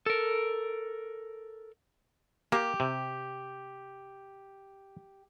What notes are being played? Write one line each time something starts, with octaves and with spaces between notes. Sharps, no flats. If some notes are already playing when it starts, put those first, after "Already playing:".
A4 A#4
A#3 G4
C3